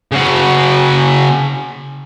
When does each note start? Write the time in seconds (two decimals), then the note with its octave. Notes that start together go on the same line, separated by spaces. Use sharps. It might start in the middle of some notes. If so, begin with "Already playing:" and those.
0.12 C#3 F#4